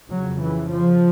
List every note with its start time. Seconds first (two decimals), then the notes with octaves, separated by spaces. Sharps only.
0.10 F2 C#3 F#3
0.41 E3
0.71 F3